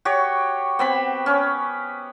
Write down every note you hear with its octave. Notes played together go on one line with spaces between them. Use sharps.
F#4 G4 C#5
B3 C4 B5
C#4